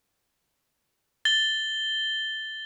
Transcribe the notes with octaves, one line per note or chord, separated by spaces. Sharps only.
A6 G7